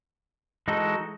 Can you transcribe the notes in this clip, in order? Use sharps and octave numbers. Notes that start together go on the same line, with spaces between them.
E3 G#3 D#4 F#4 A4